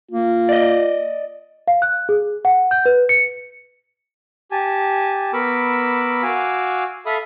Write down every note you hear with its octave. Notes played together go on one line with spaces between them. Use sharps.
A#3 F4
D5 D#5
F5
F#6
G#4
F#5
G6
B4
C#7
G4 G#5 A5
B3 A#4 B5 C#6 D6 E6
F#4 F5 G#5 D6 E6
A4 E5 F5 B5 D#6